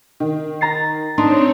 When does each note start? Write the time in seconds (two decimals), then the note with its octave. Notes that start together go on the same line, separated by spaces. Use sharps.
0.20 D#3
0.61 A#5 A6 C7
1.18 C4 D4 D#4 C#5 C6